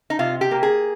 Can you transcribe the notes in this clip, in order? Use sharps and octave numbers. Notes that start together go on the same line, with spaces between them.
D#4
C3 F4
G4
A#3
G#4